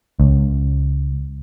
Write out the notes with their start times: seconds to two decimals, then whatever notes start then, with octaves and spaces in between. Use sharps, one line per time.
0.20 C#2